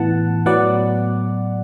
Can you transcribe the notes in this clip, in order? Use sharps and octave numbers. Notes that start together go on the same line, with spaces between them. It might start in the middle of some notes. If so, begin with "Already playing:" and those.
Already playing: A2 E3 B3 F#5 A5
A2 F#3 B3 D5 F#5